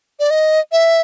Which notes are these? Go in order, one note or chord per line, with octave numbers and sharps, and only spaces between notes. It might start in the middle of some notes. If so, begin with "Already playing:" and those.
D5
D#5
E5